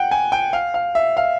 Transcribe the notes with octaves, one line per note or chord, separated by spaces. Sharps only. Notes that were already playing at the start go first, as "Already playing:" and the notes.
Already playing: F#5 G5
G#5
G5
F5
F5
E5
F5